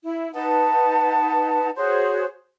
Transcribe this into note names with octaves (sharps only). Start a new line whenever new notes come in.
E4
D#4 B4 F#5 A5
F#4 G#4 C5 C#5